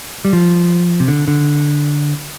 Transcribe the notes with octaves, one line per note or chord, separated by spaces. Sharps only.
G3
F3
C3
D3
D3